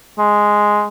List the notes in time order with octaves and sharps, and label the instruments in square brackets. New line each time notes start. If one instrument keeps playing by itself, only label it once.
[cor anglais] G#3